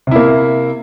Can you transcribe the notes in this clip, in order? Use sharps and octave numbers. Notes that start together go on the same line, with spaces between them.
C3 A#3 E4